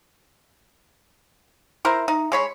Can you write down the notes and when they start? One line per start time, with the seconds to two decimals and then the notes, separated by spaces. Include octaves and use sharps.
1.85 E4 A#4 C5
2.08 D#4
2.32 G#3 C#5 B5